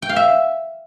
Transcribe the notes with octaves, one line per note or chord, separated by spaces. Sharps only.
G5
F5
E5